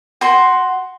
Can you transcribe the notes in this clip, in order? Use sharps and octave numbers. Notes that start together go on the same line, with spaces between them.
F#4 C6